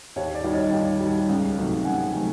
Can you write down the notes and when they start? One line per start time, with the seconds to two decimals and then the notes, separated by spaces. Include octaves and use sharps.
0.16 D#2 C#5
0.35 D5
0.44 D#3 G3
0.53 C#5 D#5
0.72 D#2
1.01 D#3 G3
1.29 C#2
1.57 C3 D#3 F#3 A3
1.85 C#2 F#5 G#5
2.14 C3 D#3 F#3 A3